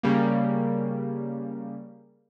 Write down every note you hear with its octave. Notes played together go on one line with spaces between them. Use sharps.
C#3 G3 A#3